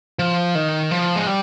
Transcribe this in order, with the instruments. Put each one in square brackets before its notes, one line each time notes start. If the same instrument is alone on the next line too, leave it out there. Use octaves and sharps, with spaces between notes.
[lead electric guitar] F3
D#3
F3
G#3
G3